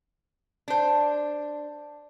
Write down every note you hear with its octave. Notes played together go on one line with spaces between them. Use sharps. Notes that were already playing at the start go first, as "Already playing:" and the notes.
D4 C5